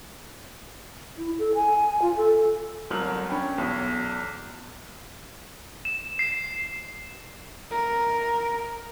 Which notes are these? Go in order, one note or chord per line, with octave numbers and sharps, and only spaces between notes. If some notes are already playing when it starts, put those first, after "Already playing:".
E4
A4
G#5
F4
A4
G1 C2 F#3 A#4 F6 F#7
C#4 D4 C#5 G5 B5
B1 E2
E7
C7
A#4